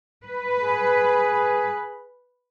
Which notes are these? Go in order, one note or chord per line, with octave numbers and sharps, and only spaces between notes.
B4
G#4